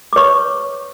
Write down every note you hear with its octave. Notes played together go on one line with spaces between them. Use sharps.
D6
B4 C#5 C#6